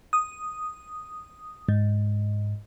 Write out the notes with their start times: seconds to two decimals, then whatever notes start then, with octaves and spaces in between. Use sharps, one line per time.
0.13 D#6
1.69 G#2